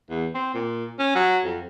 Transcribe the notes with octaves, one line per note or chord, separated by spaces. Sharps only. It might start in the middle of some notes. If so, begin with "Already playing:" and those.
E2
C4
A#2
C#4
F#3
F2